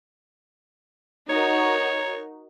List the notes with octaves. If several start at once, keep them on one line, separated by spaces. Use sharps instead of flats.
D#4 F#4 A#4 C#5